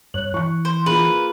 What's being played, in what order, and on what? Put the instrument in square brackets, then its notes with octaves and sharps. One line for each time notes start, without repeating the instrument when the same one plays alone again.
[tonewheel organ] G2 F#6 [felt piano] C#5
[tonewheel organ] E3 [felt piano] C#6 F#6
[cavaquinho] C5
[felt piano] A#3 F4 G#4 [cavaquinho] B4